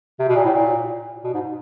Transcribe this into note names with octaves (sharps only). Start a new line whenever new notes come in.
C3
B2
A#2
A2
A#2
B2
G#2